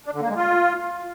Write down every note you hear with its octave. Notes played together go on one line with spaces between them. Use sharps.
D4
D3
A#3
G#3
F4